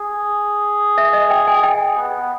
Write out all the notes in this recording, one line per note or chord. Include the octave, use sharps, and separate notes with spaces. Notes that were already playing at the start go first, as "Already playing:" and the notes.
Already playing: G#4
E5
D#5
G5
G#5
G#4 G5
B3